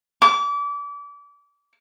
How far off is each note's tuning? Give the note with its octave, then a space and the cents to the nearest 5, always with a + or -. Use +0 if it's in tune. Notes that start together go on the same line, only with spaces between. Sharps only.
D6 -30